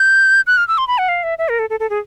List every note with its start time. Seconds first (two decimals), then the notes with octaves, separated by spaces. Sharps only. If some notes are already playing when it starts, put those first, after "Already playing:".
Already playing: G6
0.47 F#6
0.57 F6
0.68 E6
0.78 C6
0.88 B5
0.98 F#5
1.08 F5
1.23 E5
1.38 E5
1.49 A#4
1.59 A4
1.70 A4
1.80 A4
1.90 G#4